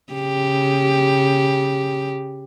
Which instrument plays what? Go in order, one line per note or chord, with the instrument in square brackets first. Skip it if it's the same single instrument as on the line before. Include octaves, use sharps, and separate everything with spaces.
[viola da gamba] C#3 G4